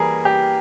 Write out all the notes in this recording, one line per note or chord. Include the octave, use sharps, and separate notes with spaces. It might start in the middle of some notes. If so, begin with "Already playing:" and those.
Already playing: E3 G3 A#3 G#4 A#4
G4